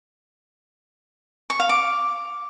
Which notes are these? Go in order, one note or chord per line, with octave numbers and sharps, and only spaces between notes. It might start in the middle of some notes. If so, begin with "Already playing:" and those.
C#6
F5
D6